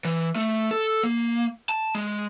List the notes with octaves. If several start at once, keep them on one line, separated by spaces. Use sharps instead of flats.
E3
A3
A4
A#3
A5
G#3